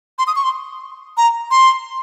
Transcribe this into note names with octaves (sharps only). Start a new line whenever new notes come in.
C6
D#6
C#6
C6
A#5
C6